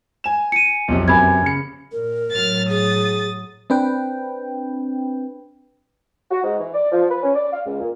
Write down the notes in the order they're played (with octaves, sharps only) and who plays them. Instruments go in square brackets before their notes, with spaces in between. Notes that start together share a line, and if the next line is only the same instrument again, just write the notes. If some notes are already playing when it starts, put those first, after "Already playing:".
[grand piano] G#5 E7
[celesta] C#7 D#7
[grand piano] B1 F2 C3
[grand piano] F#2 C3 B3 [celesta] G#5 B5 G#6
[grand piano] C#3 C#7
[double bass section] A#2 [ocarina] A#4
[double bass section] A2 F#3 [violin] F6 A6
[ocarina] G#4 [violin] D#6 A6
[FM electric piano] C4 D4 B4 G5
[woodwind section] F#4
G#2
E3
D5
F3
B4
C#4
D5
F5
C#2
A#2